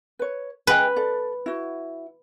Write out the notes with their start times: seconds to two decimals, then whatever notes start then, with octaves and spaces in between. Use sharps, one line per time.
0.19 B4 C#5
0.67 G#4 B4 D#5 G5
0.96 A4 D5
1.46 E4 F#4